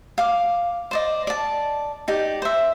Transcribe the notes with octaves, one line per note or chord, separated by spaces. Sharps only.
F5 D6
C5 D5 D#5
D5 A5
D#4 G4 D5
C5 E5